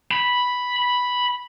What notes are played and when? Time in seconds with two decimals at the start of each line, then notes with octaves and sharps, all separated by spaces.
0.11 B5